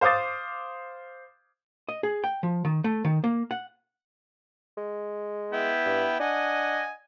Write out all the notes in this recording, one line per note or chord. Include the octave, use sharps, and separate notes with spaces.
C5 F5 D6 D#6 A6
D#5
G#4
G5
F3
D#3
A3
D#3
A#3
F#5
G#3
B3 E4 G5
G2
D4 D#5 F#5 G#5